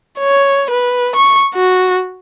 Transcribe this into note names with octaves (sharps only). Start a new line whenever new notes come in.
C#5
B4
C#6
F#4